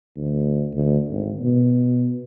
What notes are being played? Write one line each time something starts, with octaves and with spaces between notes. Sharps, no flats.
D2
D2
G#1
B2